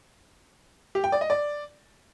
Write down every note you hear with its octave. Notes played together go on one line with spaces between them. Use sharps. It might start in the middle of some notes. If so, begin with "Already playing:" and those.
G4
G5
D5
D#5
D5